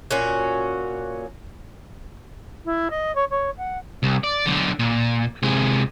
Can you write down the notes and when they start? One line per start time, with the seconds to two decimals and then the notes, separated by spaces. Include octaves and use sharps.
0.11 A#2 C#4 F#4
2.65 E4
2.90 D#5
3.15 C#5
3.30 C#5
3.57 F#5
4.03 C2
4.23 D5
4.46 B1 D3
4.79 A#2
5.43 C3 G#3